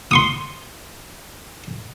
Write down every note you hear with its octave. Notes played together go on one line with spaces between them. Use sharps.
C6 C#6 D#6